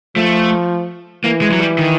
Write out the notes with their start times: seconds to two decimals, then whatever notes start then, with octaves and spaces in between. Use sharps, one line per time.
0.16 F3 A3
1.24 E3 A#3
1.41 G#3
1.52 F#3
1.59 G3
1.78 D#3